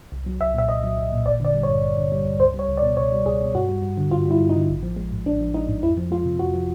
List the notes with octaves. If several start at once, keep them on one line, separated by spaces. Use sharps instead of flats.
C2
F#3
C2 E5
A#2 E5
C2 D#5
F#3
C2
A#2
G#1 D5
D3 D5
G3
G2 C#5
G#1
D3
G3
G2
C#2 C5
G3
C#5
C#2
D5
B2
C#2 C#5
G3
C#2 G#4
B2
G2 F#4
G3
G2
D3
G2 F4
G3
E4
G2
D#4
D3
A1
F3
G#3
G#2
A1 D4
F3
G#3 D#4
G#2
F2 E4
F3
G#3 F4
C3
F2 F#4
F3